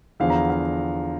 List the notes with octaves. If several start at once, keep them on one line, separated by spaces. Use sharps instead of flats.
E2 D3 F3 F5
A#5
F5